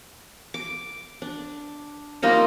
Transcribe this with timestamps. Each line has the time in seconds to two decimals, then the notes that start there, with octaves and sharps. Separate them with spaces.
0.54 D6
1.22 D4
2.22 G3 A#3 D#4 F4